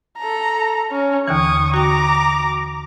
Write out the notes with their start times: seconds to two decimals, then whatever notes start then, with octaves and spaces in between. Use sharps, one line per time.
0.18 A4 A#5
0.91 C#4
1.28 D#2 D3 E3 C#6 D#6
1.74 F#4 G5 A#5 D6